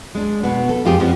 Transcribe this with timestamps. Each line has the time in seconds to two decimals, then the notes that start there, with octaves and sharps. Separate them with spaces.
0.15 G#3 D4
0.43 B2 B3
0.69 A4
0.84 F2 F4 G4 G#4
1.00 F2 F3 B3 C#4